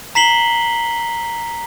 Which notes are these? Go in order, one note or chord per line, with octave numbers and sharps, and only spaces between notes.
A#5 B6 C7 F#7 G7